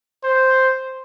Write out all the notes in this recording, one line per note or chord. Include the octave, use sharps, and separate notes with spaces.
C5